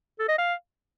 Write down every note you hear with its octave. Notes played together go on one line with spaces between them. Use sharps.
A4
D#5
F5